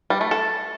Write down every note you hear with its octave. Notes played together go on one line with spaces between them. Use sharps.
G3
A3
A4